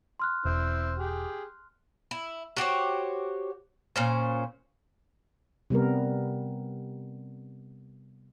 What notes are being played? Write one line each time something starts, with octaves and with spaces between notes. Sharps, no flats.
C6 F6 F#6
E1 C4 E4
G4 G#4
E4
F#4 G4 C5 C#5
A#2 C#4 C5
C3 G3 B3 A#4